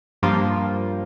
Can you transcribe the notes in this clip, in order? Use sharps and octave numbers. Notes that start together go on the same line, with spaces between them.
G2 F3 A#3 F4